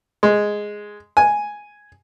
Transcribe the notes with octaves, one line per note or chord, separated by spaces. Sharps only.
G#3
G#5